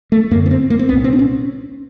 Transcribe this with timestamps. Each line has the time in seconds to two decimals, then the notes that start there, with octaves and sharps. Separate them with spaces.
0.12 A3
0.31 F#2 A#3
0.34 D3
0.46 B3
0.51 C4
0.70 A#3
0.79 C4
0.89 C2 A#2 B3
1.04 C4
1.13 D4
1.19 C#4